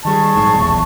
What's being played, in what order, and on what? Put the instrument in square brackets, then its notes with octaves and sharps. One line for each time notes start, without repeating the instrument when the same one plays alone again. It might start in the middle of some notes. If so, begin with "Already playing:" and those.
[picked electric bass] D#3 G3 [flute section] G#4 A5 C#6
[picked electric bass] A#1 G#2
D#1 B1 E2